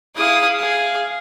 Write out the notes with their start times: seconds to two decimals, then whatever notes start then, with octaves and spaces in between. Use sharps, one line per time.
0.16 E4 G#4 F5 D#6
0.61 G#4 F5